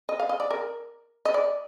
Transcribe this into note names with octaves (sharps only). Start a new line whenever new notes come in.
D#5
F5
D#5
D5
A#4
D#5
D5